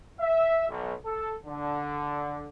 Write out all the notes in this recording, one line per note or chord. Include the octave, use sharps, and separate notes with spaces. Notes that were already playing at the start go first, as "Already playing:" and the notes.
E5
B1
A4
D3